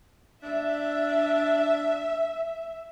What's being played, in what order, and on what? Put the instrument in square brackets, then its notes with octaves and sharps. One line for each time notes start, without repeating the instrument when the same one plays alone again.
[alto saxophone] D4 [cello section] E5